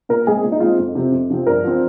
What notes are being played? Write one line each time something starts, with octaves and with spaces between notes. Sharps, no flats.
A#2 A#4
G#3 C4 G#4
A#2
D#4
G#3 C4 F4
F2
C3 F3 C4
F2
C3 F3 C4
G2 A#4
F3 C4